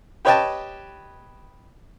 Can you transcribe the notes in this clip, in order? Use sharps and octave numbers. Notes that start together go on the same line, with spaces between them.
G4 B4 C#5 D#5 G5 A5